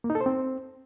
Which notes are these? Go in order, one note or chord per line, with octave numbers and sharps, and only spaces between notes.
A#3
D#4
A4
C5
C4